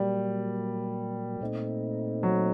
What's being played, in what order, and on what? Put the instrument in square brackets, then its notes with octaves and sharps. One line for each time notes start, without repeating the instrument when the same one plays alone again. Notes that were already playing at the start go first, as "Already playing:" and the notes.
Already playing: [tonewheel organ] A#2 F#3 A#3 [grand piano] G3
[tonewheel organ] A#2 A3 C4 D#4
[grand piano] F#3